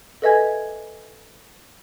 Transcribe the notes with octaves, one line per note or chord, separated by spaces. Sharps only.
A4 B4 D#5 E5 G#5 G#6